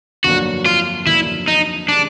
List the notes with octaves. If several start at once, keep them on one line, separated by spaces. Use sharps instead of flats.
G1 F2 D3 F#3 A#3 F#4
F4
G1 F2 D3 F#3 A#3 E4
D#4
C3 D#3 G#3 D4